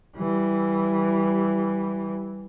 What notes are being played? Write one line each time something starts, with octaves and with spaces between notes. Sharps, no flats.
E3 G3